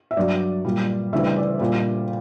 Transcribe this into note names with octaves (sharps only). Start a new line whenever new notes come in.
E5
G2 F#3 D5
A#2 G3
D2 C#3 E3 G3 E5
D5
A#2 G3